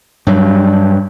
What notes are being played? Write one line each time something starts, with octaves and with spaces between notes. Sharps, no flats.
G2 F#3